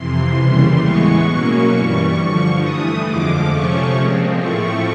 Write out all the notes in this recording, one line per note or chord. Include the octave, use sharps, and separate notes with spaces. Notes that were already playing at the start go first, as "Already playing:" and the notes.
Already playing: F2 C3 E3 C6
D#2 C#3 E3 G3
A2 E3 G#3 B3 C#6
B2 F#3 A#3 C#4
G2 E3 G3
G2 D3 F3 C#6
G2 E3 A3 D#6
F2 D3 F3 G#3 D6
C3 F3 A3 C#4 C#6
A#2 F3 G#3 C4
A2 F3 A3 C4 C#6